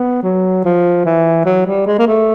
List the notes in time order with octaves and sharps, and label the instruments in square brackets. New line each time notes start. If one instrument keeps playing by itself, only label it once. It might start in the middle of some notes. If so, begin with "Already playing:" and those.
Already playing: [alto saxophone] B3
F#3
F3
E3
F#3
G3
G#3
A#3
A3